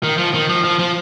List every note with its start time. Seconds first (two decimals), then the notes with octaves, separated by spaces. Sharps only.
0.03 D#3
0.18 F3
0.34 D#3
0.49 F3
0.64 F3
0.79 F3